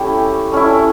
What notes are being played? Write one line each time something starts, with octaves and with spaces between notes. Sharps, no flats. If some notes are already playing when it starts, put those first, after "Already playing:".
Already playing: A3 C#4 E4 G4
A3 C#4 E4